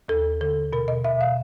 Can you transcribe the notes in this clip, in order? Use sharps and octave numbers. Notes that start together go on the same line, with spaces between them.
D#2 A4
D3 A4
B2 A#4
D#5
B2 E5
F5